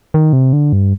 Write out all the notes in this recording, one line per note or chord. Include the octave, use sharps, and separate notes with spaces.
D#3
C3
D3
G2